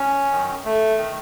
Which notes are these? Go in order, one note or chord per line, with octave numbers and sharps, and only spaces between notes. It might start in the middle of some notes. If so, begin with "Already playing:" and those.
Already playing: C#4
F#2 D#3
A3
D#3